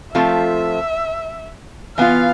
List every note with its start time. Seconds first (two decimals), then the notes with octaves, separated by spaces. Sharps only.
0.14 F3 A3 C4 F4 A4 E5
1.98 E3 B3 F4 F5